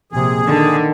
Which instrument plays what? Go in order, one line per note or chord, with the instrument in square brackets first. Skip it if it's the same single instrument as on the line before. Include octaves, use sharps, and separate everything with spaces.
[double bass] A#1 C3 [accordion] G#4
[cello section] D3 [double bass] D#3